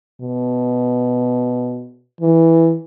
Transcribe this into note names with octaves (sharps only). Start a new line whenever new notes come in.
B2
E3